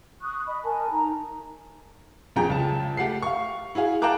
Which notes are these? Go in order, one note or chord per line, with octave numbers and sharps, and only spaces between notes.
C#6 D#6 F#6
D#5 B5
A#4 G#5 A5
D#4 A#5
D#1 F2 F3 G#4 G5 A#5
C#2 A5
A3 G4 F#5 C7
F5 C#6
E4 F#4 G#4 F5
F5 G5 A5 A#5 D6 F#6